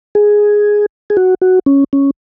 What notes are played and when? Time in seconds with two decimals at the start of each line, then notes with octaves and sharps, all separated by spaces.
0.15 G#4
1.10 G#4
1.17 F#4
1.42 F#4
1.66 C#4
1.93 C#4